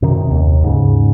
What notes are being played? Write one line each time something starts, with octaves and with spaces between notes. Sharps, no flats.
F#2 C3 D#3
D#2
G#2 C#3